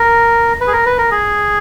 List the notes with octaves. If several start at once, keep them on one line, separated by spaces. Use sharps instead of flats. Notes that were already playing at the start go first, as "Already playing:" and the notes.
Already playing: A#4
B4
G#4
A#4
B4
A#4
G#4